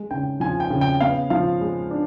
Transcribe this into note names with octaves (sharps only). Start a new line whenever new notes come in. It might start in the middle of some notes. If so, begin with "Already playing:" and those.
Already playing: G#3
C#3 G5
F3 G#5
G5
C#3
G5
B3 F5
F3 F5
G#3
D4